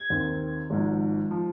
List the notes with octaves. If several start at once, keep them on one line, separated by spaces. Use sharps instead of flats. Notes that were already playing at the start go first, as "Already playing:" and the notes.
Already playing: G#6
D#2 D#3 C4
G#1 G#2 F3
F3